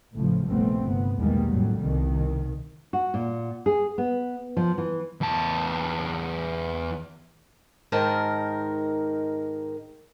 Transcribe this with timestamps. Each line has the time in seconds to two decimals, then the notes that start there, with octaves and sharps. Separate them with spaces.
0.13 A1 A2 C#3 F3
0.47 F1 A#1 G3 A3 B3 C4
0.82 G1 C3 B3
1.17 B1 E2 D#3 G3 G#3 A#3
1.48 F2 A2 F#3 G3
1.81 C2 B2 D#3
2.93 F#4
3.14 A#2
3.66 G#4
3.98 B3
4.57 F3
4.78 E3
5.21 E2 A5
7.92 G#2 D#3 A#4 A5